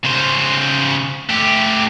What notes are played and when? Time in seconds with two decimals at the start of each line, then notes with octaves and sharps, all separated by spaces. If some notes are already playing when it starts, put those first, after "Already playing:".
0.05 C#3 C5
1.30 A3 G4